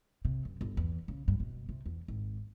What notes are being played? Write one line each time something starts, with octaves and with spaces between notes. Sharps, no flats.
C3
F#2
G1
E2
C#3
G2
B2
C3
E2
G#1